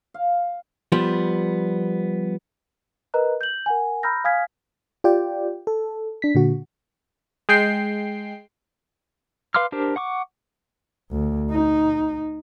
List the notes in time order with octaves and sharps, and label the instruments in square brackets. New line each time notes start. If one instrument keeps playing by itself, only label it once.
[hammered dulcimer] F5
[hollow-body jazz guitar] F3 G3 B3
[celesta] A#4 B4 D#5 A#5 F#6
G6 F#7
A#4 F#5 G#5
A#5 B5 E6 F6 G6 A#6
F5 G#5 D#6 F6 G#6 B6
[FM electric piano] F4 G4 D5 G5
A4
D4 B6
A#2 D3 F#4
[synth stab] G#3 G5 C7
[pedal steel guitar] B4 F5 C6 D6 F6
D4 G4 A#4 C5
F#5 C#6 D6
[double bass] D2
D#4